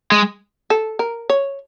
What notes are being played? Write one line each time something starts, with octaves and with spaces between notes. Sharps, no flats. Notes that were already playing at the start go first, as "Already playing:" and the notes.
G#3
A4
A#4
C#5